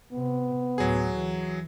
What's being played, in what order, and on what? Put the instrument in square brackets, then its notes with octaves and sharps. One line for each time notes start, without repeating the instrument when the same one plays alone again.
[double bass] C3 [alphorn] B3
[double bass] D2 A2 [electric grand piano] F#3 G#4
[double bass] E3